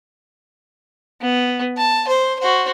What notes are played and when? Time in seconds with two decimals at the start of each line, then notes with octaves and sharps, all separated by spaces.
1.21 B3
1.77 A5
2.08 C5
2.39 F#4 C5